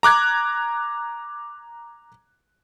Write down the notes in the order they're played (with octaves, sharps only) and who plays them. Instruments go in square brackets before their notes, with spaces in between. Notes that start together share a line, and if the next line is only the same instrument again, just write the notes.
[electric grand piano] A#5 D6 F#6 G#6